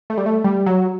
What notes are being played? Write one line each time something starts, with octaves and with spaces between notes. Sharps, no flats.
A3
G3
A3
G3
F#3